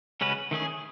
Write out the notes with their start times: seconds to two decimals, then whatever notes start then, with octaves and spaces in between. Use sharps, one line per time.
0.21 C#3 G#3 C#4 F#4 B4
0.51 D#3 A3 C#4 G#4